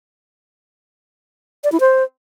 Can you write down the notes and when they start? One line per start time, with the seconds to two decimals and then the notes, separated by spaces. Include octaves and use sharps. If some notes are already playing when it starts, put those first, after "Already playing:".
1.64 D5
1.72 E4
1.80 C5